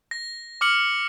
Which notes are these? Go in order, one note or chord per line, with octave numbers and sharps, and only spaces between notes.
A#6
D6 F6 C#7 F#7